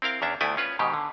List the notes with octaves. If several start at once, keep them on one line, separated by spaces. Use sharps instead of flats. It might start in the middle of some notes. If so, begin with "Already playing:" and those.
C4 E4 A#4 F5 G5
E2 C#4 D4 E5
D2 A3 B3 E4 G5 G#5
C#4 F4 B4
G#2 B2 D#3 G4
D3